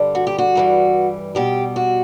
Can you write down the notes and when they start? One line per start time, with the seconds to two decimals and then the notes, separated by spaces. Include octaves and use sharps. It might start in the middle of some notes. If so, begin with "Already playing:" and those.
Already playing: G2 D3 G3
0.15 F#4
0.27 G4
0.38 F#4
0.55 G2 E3 G3
1.35 B2 G3 G4
1.76 F#4